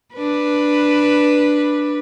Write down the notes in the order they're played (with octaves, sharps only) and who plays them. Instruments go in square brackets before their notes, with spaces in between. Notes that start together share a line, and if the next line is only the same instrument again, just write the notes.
[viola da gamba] D4 B4